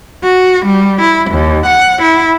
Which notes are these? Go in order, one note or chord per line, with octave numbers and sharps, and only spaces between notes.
F#4
G3
E4
D#2
F#5
E4